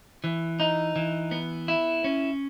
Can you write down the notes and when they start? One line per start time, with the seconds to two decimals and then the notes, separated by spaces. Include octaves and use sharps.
0.24 E3
0.60 D#4
0.96 E3
1.31 B3
1.68 E4
2.04 C#4